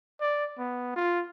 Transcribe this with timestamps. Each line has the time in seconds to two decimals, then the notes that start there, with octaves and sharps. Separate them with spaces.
0.21 D5
0.58 B3
0.96 F4